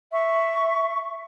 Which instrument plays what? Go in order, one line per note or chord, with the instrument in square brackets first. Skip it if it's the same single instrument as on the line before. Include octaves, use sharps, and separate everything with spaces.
[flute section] E5 C#6